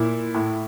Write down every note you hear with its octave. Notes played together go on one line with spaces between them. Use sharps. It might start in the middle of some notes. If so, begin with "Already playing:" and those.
Already playing: A#2 E4
A2